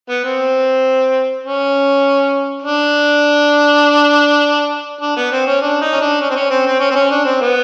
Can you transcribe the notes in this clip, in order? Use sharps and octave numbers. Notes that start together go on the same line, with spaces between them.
B3
C4
C#4
D4
D4
B3
C4
C#4
D4
D#4
C#4
D4
C#4
C4
C#4
C4
C4
C#4
C4
C#4
D4
C4
B3